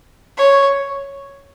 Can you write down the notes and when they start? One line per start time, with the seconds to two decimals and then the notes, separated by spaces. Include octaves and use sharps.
0.37 C#5